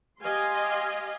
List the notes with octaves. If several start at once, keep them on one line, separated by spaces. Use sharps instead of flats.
G4 D#5 F5 G#5 C6